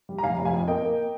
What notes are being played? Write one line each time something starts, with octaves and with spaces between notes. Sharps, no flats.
G3
A#5
F1 F5 G#5
F1
F5 G#5
F2
A#3 D#5 G5
A#3